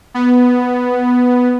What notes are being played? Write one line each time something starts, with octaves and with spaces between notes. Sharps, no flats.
B3